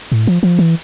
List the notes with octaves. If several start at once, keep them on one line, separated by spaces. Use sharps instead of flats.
A2
F3
F3
E3